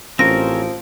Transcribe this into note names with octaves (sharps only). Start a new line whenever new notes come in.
A1 F3 C4 C#4 A#4 A#6